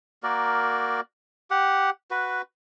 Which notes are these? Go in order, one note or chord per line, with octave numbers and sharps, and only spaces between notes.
A#3 F#4 A#4 D5
G4 F#5
F#4 B4